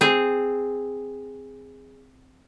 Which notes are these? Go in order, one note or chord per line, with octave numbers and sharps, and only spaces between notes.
C4 G#4